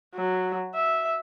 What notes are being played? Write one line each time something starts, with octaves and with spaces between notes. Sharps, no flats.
F#3
E5